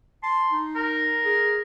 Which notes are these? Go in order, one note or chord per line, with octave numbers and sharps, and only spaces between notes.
A5 C6
D#4
A#4
G#4